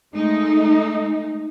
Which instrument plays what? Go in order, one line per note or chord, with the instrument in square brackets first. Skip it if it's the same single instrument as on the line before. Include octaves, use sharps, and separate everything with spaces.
[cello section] G#3 A3 D#4